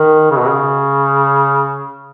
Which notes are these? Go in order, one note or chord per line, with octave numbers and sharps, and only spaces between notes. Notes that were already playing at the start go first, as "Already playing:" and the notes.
Already playing: D#3
C#3
B2
C#3